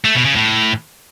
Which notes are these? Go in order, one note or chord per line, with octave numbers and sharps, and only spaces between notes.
A3
B2
C#3
A2